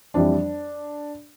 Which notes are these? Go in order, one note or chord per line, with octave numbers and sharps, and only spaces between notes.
F2 E3 G3 D4